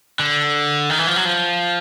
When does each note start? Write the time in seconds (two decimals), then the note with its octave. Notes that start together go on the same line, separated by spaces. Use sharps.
0.19 D3
0.90 D#3
0.98 E3
1.07 F3
1.16 F#3
1.25 F3